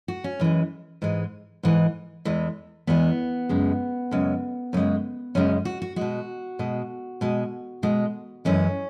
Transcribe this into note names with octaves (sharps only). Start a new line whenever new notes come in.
F#4
C#4
F#2 E3 G#3
G#2 E3 G#3
G#2 E3 G#3
E2 E3 G#3
E2 E3 G#3 B3
F#2 C#3 G#3
F#2 C#3 G#3
F#2 C#3 G#3
F#2 C#3 G#3 C#4
F#4
F#4
B2 G#3 F#4
B2 G#3
B2 G#3
B2 G#3
F#2 E3 G#3 C#4